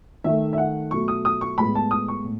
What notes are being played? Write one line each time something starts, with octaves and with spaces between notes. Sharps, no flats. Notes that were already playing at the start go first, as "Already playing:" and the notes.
D#3 A3 E5
E5
F#5
B2 F#3 A3 C#6
D#6
D#6
C#6
A2 G#3 B3 B5
A5
D#6
C#6
A2